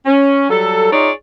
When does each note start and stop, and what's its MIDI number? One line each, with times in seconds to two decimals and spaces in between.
0.06 0.49 61
0.50 0.91 54
0.50 0.91 55
0.50 0.91 69
0.92 1.10 63
0.92 1.10 65
0.92 1.10 68
0.92 1.10 73
0.92 1.10 74